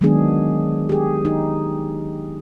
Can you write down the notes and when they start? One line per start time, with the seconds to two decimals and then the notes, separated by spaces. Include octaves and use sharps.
0.01 D#3 F#3 G#3 B3 D4 G#4
0.89 G4 G#4
1.25 D#4